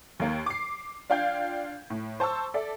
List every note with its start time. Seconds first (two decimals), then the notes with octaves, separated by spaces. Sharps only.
0.20 D#2 A#3
0.46 D6 C7
1.10 D4 F4 F5 G5 G6 G#6
1.90 A2
2.20 C5 A5 C#6 E6
2.54 A4 D5 E5